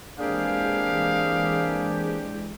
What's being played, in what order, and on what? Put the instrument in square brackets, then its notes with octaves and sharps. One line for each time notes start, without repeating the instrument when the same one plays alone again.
[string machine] E3 G#3 [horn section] A#3 C4 G#4 [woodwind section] D4 G4 [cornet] F5